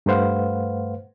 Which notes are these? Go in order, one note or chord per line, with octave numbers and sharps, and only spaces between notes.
G2 A3 B4 C5 F5 F#5